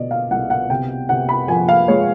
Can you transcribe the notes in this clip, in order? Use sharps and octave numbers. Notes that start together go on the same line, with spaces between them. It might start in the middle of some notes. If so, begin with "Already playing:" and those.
Already playing: B2 D5 D#5
F5
C2 F#5
F#5
C3 G5
C3 F#5
B5
F3 G#5
F5
G#3 C#5